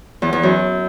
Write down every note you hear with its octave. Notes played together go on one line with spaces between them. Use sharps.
E2
E2
F#2